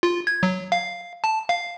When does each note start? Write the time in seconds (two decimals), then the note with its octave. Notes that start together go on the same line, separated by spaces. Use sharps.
0.03 F4
0.27 G#6
0.43 F#3
0.72 F5
1.24 A5
1.49 F5